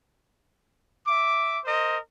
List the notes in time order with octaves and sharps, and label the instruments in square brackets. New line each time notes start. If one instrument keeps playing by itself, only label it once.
[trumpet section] E5 D6
A#4 C5 D#5